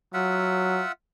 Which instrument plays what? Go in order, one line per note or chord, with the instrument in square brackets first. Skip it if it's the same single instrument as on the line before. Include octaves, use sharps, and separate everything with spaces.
[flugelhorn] F#3 [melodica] F4 E5 F#5